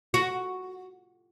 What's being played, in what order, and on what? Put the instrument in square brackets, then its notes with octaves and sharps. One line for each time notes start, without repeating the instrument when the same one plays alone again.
[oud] F#4